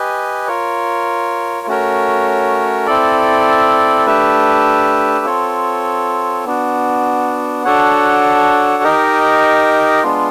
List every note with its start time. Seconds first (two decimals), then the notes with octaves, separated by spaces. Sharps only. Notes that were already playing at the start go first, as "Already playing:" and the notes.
Already playing: G4 B4 D#5 G#5
0.47 F4 A#4 C#5
1.67 A3 C#4 F#4 A#4 C#5
2.86 C4 E4 A4 D5
4.06 A3 D4 G4 B4 E5
5.26 C4 F4 A4 C#5
6.45 B3 D4 F#4
7.65 D4 F#4 A4 C#5 F#5
8.83 D#4 G4 A#4 D#5
10.03 G#3 B3 D4 F4